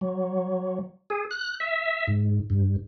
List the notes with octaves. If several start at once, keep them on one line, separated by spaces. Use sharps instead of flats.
F#3
G#4
F#6
E5
G#2
G2